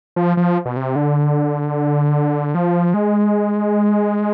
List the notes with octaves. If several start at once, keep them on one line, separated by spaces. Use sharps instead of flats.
F3
F3
B2
C3
D3
F3
G#3